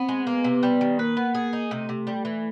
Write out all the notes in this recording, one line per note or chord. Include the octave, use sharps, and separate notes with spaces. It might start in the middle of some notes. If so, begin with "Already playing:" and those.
Already playing: B3 C4
G#3
A#3 B3
C3
G3
D#3
A#3 B4
B3
G#4
D#4
C3 A3
C3
G3
E3